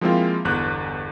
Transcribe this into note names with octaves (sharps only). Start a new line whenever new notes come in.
F3 G#3 A#3 C4 E4 F4
G1 E2 F#6